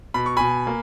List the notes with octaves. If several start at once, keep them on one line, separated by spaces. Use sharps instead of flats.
B2 B5
C#6
B2 G#5 B5
A#3